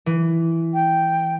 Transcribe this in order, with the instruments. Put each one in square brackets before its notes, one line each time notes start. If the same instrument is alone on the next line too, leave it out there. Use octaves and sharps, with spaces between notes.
[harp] E3
[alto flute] G5